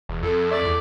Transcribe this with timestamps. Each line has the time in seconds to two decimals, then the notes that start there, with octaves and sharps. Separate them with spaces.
0.09 E1
0.23 F2 A4
0.51 A3 D5
0.65 E2